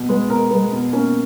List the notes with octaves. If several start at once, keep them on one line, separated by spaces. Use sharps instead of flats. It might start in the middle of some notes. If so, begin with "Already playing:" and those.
Already playing: B2
G#3 B3
B2 A#4
G#3 B3
B2
A#3 C#4